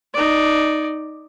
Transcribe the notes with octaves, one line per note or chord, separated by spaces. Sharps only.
D#4 D5